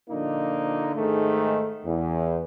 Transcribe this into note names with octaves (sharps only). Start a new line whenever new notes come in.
A#2 D3 F3 A#3 D4 D#4
G#2 D#3 G#3 A3
E2